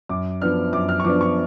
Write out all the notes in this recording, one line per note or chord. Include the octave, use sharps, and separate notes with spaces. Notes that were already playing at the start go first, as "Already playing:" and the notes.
F#2 D6
F3 B3 D4 F6
F#2 D6
F6
C#6
F3 B3 D4 D6
C#6